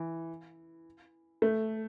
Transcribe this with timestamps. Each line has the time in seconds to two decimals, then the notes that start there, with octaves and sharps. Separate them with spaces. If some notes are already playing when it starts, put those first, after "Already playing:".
Already playing: E3
1.42 A3